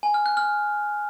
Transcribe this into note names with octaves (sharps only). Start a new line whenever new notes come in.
G#5
F6
F#6
F6